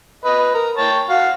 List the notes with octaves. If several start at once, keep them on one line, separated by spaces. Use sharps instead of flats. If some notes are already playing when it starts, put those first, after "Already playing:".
B4 D#5
A#4
C#5 G5 A5
F#4 F5